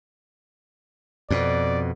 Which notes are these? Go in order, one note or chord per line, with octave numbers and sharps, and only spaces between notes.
F2 B2 D5